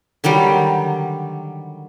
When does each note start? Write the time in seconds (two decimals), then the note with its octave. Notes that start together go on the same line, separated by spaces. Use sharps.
0.24 D3 D#3 F#3 G3